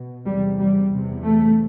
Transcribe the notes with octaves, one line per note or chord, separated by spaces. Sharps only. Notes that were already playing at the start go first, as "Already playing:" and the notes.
Already playing: B2
E2 C3 G3
G3
E2 C3
A3